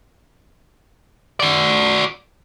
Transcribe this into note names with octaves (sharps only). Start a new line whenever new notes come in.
F#4 D5